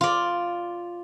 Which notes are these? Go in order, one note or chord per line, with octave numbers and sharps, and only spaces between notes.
F4 D5